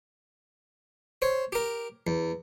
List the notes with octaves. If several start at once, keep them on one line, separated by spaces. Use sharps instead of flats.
C5 C#5
G4 A#4
E2